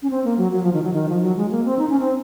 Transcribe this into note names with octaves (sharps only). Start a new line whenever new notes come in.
C#4
C4
A#3
F#3
F#3
F3
D#3
F#3
D#3
F3
F#3
G#3
A#3
C4
D#4
C#4
C4